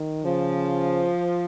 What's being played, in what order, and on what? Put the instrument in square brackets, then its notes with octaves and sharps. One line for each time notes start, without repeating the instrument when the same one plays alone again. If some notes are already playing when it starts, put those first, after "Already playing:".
Already playing: [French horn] D#3
[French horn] C#3 [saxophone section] F3